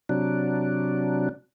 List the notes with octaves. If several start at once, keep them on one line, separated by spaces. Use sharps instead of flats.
C3 F#3 D4